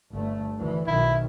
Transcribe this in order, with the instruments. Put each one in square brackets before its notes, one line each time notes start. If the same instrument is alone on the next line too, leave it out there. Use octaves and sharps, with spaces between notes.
[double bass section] G1 A3
D2 E3
[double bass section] B1 B2 D#3 [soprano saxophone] E4